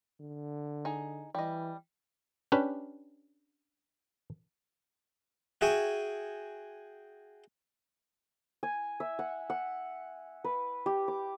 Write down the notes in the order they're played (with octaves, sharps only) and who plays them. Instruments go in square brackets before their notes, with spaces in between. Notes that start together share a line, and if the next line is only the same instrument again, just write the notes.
[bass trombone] D3
[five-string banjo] D#4 G#4
[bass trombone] E3 [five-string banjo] G3 D#5
[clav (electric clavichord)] C#4 D4 G4 B4
[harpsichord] F#4 G#4 E5 G5 G#5 C#6
[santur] G#5
E5
F#5
F#5
B4
G4
D6